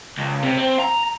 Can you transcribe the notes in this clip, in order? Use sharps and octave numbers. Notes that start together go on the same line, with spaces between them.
C#2
C3
C4
A#5